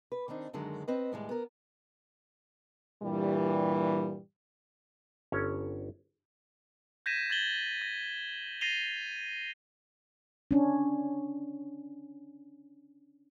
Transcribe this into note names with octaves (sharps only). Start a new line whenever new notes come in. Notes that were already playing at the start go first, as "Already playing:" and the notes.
B4
D#3 C4 D4 D#4
F#2 D3 D#3 F#3 G#3
C4 B4 D#5
D#2 A2 G3 G#3
B3 A#4
G2 A#2 E3 G3
G1 C#4 A4 C#5
G6 G#6 A#6 B6 D#7 E7
G#6 A6 F#7 G7
A#6
A6 A#6 C7 D#7 F7 G7
C#4 D4